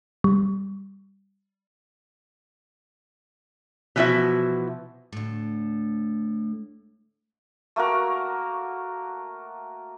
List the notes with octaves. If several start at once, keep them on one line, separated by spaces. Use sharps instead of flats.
G3
B2 E3 F3 E4 F#4 E5
D2 A2
A3 A#3 F#4 A#4